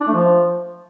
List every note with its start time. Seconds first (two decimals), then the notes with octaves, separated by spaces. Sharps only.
0.01 D4
0.07 A3
0.14 F3